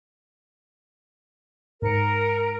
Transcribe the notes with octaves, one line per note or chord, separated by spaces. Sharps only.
G#2 A#4 C#7